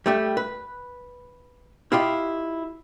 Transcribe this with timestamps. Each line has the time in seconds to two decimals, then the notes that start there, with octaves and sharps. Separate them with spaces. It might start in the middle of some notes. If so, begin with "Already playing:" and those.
0.06 G3 A3 G4
0.37 B4
1.92 E4 F4 G4 D#5